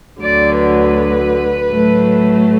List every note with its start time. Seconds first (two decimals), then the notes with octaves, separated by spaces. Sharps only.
0.21 D2 D3 F#3 D5
0.59 B4
1.71 A2 F#3 A3